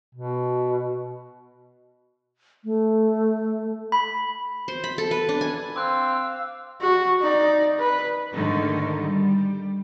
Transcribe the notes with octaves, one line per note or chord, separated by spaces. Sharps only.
B2
A3
B5
C5
B5
A4
B4
D4
G#5
C4 F5 D6 E6 F#6
F#4
D#4 D5
B4
G#2 D3 D#3 A3 D#4
G3